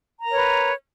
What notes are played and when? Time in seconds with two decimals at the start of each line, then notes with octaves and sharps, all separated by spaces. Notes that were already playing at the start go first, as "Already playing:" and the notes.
0.20 A#5
0.25 A#4
0.29 C#5
0.34 B4